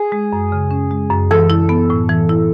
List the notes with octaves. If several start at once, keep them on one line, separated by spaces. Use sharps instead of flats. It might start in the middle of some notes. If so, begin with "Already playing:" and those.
Already playing: G#4
G#3
F#2
C#3
C#4
G#3
F#2
E3 A4
E4
B3
A2
E3
E4